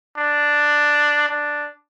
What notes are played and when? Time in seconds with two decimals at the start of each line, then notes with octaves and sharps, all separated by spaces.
0.17 D4
1.29 D4